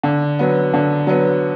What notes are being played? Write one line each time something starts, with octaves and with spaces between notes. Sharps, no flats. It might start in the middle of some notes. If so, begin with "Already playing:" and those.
D3
F#3 B3
D3
F#3 B3